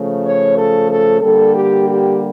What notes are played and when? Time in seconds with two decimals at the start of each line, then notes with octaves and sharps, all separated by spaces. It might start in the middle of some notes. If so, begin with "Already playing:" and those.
Already playing: C#3 F3 A3
0.24 C#5
0.56 A4
0.89 A4
1.21 D3 G3 A#3 A4
1.54 G4
1.87 G4